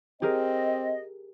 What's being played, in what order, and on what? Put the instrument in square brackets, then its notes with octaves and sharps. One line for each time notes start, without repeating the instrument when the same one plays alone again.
[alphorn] C4 [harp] G4 G#4 A#4 [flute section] D#5